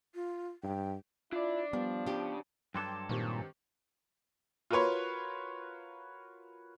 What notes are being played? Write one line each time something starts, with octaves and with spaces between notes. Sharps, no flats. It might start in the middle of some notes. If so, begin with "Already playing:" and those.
F4
G2 G5
D4 E4 F4 D5
F3 G3 B3
C#3 D4 G4
G2 F#3 A4 G5 C6 D6
A#2 D#3 C4 G4
F4 F#4 A#4 B4 C#5 C6